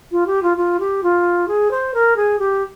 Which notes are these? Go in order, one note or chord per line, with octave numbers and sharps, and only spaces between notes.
F4
G4
F4
F4
G4
F4
G#4
C5
A#4
G#4
G4